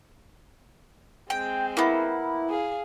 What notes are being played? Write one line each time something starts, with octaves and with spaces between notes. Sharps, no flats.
G#3 C4 G5
A#3 B3 E4
G#4 F5